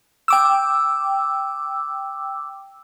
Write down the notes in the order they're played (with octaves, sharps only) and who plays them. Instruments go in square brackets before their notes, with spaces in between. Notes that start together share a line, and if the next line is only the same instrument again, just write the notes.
[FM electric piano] G5 D6 E6